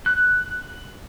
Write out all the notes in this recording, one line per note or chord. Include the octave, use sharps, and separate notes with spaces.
F#6